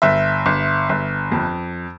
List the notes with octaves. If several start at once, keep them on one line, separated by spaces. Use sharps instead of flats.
G1 E5
G1
G1
F2